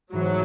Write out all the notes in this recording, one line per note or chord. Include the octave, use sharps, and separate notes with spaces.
G#2 E3 F#3 A3